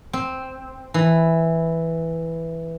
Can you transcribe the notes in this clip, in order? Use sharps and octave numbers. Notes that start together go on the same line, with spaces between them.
C4
E3